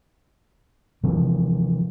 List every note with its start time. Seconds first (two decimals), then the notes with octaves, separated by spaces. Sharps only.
1.03 C3 E3 F3